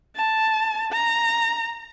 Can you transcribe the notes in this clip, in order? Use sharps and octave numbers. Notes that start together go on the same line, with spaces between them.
A5
A#5